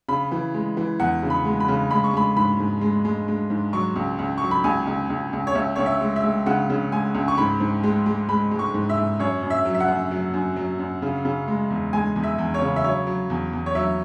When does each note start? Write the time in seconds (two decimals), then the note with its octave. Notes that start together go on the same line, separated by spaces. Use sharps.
0.08 C#3 B5
0.31 E3
0.54 G#3
0.77 E3
1.00 E2 F#5
1.23 C#3
1.30 B5
1.45 G#3
1.60 B5
1.68 C#3
1.91 G#3 B5
2.04 C#6
2.13 G#3 B5
2.36 G#2 B5
2.59 G#2
2.81 G#3
3.05 G#3
3.28 G#3
3.50 G#2
3.73 F#3 C#6
3.96 C#2
4.19 C#2
4.38 F#3 C#6
4.51 B5
4.64 C#2 G#5
4.87 C#2
5.10 C#2
5.33 C#2
5.47 C#5
5.55 C#2 E5
5.76 C#2 C#5
5.86 E5
6.01 G#3
6.16 E5
6.24 G#3
6.46 C#3 F#5
6.70 C#3
6.92 G#3 G#5
7.15 C#2
7.28 C#6
7.38 G#2 B5
7.60 G#2
7.84 G#3
8.06 G#3
8.29 G#3 B5
8.51 G#3
8.59 C#6
8.74 G#2
8.89 E5
8.97 G#2
9.20 F#2 C#5
9.43 F#2
9.50 E5
9.65 F#3
9.75 E5
9.80 F#5
9.88 F#2
10.11 F#3
10.34 F#2
10.56 F#3
10.79 F#2
11.02 C#3
11.25 C#3
11.48 G#3
11.70 E2
11.93 G#3 G#5
12.16 E2
12.23 E5
12.39 E2
12.54 C#5
12.62 C#3
12.76 E5
12.84 F#3 C#5
13.07 F#3
13.30 E2
13.53 E2
13.66 C#5
13.75 F#3 E5